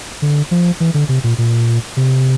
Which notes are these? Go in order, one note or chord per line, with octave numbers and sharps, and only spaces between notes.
D3
F3
E3
D3
C3
A#2
A#2
C3